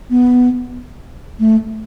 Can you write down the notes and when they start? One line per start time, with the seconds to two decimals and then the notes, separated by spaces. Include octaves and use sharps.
0.10 B3
1.39 A3